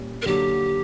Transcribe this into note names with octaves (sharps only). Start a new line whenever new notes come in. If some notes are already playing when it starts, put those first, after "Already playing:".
Already playing: A#2 G3 C#4
A#4
D3 F#3 A#3 G4